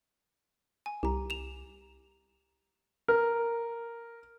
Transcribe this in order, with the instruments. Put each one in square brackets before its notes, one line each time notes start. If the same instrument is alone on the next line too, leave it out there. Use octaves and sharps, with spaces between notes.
[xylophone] G#5
[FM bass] C2 [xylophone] G4 A#5
[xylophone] E7 F7
[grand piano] A#4